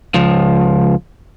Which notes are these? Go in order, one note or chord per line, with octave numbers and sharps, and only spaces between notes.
C#2 F3